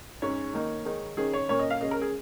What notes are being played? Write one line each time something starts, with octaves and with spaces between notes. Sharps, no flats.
G#2 G#3 C#4 C#5
D#3 A#3 D#4
D#3 G#3 D#4
D#3 C#4 G#4
C#5
A#2 A#3 C#4 C#5
D#5
F5
C#3 G#3 C#4 D#5
A#4
G#4